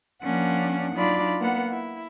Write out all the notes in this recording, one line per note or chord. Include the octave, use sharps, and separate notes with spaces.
F3 A#3 C#4 D4 F#5
F#3 D4 D#4 F4 D5 B5
A#3 B3 F#5
E4